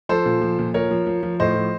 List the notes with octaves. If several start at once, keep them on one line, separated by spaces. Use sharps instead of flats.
F3 A4 C5
A#2
F3
A#2
F3 A#4 C#5
F3
F3
F3
A2 C5 D#5
F3